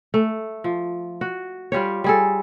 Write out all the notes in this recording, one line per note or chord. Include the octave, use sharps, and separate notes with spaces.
A3
F3
F#4
G3 F4 G4 C#5
G3 G#4 A4